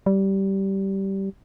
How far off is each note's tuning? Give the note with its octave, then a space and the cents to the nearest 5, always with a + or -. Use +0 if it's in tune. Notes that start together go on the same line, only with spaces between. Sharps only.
G3 -15